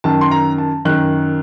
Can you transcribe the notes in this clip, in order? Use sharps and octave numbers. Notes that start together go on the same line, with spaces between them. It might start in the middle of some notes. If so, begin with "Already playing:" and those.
F#2 D#3 A5
C6
A#5
A5
F#2 D#3 F#6